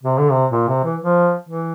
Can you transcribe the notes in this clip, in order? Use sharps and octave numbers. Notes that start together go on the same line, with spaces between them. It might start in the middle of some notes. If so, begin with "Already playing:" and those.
C3
D3
C3
A#2
C3
E3
F3
E3